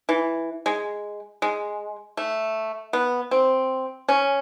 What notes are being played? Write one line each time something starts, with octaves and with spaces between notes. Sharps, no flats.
E3
G#3
G#3
A3
B3
C4
C#4